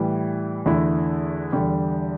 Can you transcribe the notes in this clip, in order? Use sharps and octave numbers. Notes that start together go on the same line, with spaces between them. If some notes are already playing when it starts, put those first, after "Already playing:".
Already playing: A2 E3 G3
E2 D3 A3 E4
E2 D3 G3